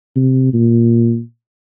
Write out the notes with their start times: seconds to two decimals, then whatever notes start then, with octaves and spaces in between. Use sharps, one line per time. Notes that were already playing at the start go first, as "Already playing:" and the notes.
0.16 C3
0.54 A#2